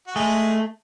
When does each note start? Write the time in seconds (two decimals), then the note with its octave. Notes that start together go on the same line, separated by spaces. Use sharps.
0.07 F#4
0.15 G#3 A3 G#4